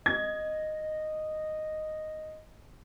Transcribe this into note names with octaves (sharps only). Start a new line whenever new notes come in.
D#5 G#6